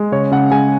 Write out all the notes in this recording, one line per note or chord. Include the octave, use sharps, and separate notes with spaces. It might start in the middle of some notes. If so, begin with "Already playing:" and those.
Already playing: G#3
C#3 C#5
C#3 F#5
G#3 G#5